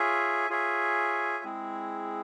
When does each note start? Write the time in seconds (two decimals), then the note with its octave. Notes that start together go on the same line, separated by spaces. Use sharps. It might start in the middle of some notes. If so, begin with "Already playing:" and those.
Already playing: F4 G#4 C#5 E5 G#5
0.50 F4 G#4 C#5 E5 G#5
1.44 G#3 C4 E4 G#4